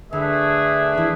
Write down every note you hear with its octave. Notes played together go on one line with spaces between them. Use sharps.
D3 A3 D4 G#4 B4 E5
E3